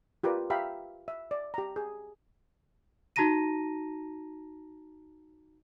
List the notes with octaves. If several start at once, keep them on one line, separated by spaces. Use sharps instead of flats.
F4 G4 A#4 B4 D5
G4 E5 F5 G5 A#5 B5
E5
D5
G4 A#5
G#4
D#4 F#4 A5 A#5 A#6 D#7